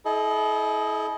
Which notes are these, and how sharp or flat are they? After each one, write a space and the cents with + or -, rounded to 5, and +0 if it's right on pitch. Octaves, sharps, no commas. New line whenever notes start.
E4 -25 A4 -45 D#5 +0